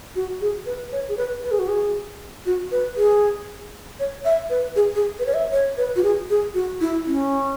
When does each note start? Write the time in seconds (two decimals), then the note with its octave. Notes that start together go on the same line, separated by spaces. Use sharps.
0.16 F#4
0.41 G#4
0.66 B4
0.92 C#5
1.08 G#4
1.17 B4
1.44 B4
1.51 G#4
1.59 F#4
1.68 G#4
2.46 F#4
2.72 B4
2.96 G#4
4.00 C#5
4.25 E5
4.50 B4
4.76 G#4
4.95 G#4
5.19 B4
5.27 C#5
5.34 E5
5.52 C#5
5.77 B4
5.96 F#4
6.03 G#4
6.30 G#4
6.54 F#4
6.81 E4
7.06 C#4